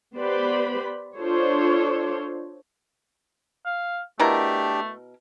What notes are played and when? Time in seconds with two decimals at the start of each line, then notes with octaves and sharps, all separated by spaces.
0.17 B3 G4 B4 C5 D5 B5
1.17 D4 F4 A4 C5 C#5
3.66 F5
4.20 B2 A3 D4 E4 G4 A#4